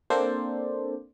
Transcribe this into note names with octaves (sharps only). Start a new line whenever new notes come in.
A#3 C4 D4 A4 C5 D5